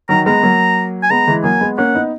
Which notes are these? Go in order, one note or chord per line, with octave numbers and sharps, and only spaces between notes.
D#3 F#3 A#5
G#3 B3 A#5
F#3 A#3
G#5
G#3 B3 A#5
E3 G#3
F#3 A#3 G#5
G#3 B3
A#3 C#4 F#5
B3 D#4